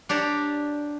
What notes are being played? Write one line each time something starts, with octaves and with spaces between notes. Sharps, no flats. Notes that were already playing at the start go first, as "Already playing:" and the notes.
D4 G4 C#5 A5 A#5